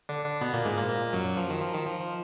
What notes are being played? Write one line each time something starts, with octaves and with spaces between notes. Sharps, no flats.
D3 D4
D3 D4
B2 B3
A#2 A#3
G#2 G#3
A#2 A#3
A#2 A#3
F#2 F#3
F3
D#3
F3
D#3
F3
F3